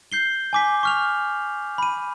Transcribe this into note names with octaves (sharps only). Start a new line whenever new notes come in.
G6 C7 G7
G#5 D6 B6
C#6 F6 F7
B5 D#7